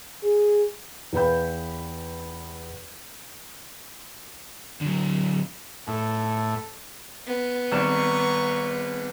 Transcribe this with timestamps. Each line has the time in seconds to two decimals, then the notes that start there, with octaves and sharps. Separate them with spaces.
0.23 G#4
1.13 E2 B4 F5 G5 B5 G6
4.81 D3 F#3
5.88 A2 A4
7.26 B3
7.72 G#1 G3 A4 A#5 C#6 E7